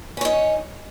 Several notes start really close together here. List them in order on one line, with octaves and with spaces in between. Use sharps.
C#4 C#5 D#4